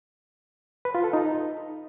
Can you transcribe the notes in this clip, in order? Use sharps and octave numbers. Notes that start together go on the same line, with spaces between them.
B4
F4
A4
D#4